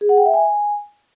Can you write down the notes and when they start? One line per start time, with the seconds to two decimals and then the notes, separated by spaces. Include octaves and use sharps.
0.01 G#4
0.09 F#5
0.17 G5
0.26 E5
0.34 G#5